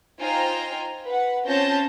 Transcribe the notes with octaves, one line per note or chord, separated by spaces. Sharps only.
D#4 F4 C5 G5 G#5 A#5
B4 F#5
C4 C#4 F4 A5 G6 A#6